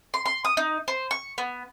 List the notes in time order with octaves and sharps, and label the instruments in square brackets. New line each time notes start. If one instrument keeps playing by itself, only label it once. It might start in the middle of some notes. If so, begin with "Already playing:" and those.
[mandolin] C6
C6
D#6
D#4
C5
C#6
B3